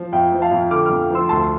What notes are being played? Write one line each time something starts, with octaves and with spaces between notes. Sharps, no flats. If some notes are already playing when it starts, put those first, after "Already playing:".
Already playing: F3
F2 E5 G5
F3
F5 A5
F2
D3 D6 F6
F2 D6 F6
F3 C6 E6
D2 A5 C6